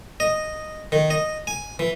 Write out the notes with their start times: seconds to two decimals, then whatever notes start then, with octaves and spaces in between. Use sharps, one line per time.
0.20 D#5
0.92 D#3
1.10 D#5
1.47 G#5
1.79 E3